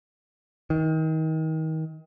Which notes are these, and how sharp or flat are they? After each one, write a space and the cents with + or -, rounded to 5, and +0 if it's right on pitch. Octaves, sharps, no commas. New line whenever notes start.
D#3 +30